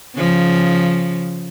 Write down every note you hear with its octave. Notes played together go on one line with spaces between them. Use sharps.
C#3 F3